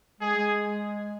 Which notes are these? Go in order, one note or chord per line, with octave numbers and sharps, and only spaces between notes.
G#3 G#4
G#3